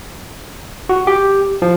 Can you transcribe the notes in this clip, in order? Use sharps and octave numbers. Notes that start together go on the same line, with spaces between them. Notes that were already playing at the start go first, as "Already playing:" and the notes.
F#4
G4
F3